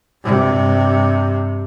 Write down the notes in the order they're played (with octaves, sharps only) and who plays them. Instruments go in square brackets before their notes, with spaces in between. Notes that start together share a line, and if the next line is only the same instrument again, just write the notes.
[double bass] G2 C3